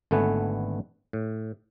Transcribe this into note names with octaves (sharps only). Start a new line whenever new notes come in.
G#1 D3 A3 B3 B4 G#5
A2